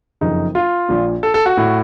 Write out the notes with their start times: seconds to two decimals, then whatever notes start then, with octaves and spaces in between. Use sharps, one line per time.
0.21 F#1 F2 C#3 D#4
0.55 F4
0.89 A#1 A#2
1.23 A4
1.34 A4
1.46 F#4
1.57 A2